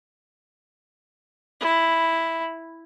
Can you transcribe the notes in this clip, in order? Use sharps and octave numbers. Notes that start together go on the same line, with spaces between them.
E4